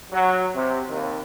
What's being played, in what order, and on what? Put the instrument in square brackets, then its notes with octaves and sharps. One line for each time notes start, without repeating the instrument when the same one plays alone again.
[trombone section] F#3
C3
D#2